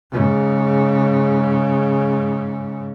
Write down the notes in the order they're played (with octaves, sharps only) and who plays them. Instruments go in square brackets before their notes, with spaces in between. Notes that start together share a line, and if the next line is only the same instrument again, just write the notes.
[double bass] G#2 C#3